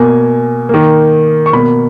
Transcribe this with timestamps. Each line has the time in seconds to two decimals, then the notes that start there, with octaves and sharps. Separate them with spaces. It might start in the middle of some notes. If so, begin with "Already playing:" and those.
Already playing: B2 A#3 G#5
0.69 D#3 A#3
1.46 C#6
1.53 B2 B5
1.58 A#3